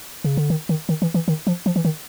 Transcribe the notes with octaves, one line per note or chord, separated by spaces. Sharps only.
C#3
D3
D#3
D#3
D#3
E3
E3
D#3
F3
F3
E3
D#3